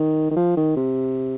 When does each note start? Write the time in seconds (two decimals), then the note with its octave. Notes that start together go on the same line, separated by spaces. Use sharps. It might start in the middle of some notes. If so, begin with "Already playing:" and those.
Already playing: D#3
0.31 D#3
0.36 F3
0.57 D#3
0.76 C3